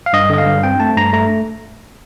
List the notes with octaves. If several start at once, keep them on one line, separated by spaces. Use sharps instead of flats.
F5
G2 D#5
D3 D#5
F5
G2
C4 G5
A3 A5
G2 A#5
A3 A#5